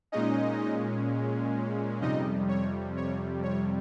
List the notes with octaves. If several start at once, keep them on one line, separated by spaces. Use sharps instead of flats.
A#2 G#3 C#4 D#4 D#5
F2 C3 G3 D#4 D#5
C#5
C#5
C#5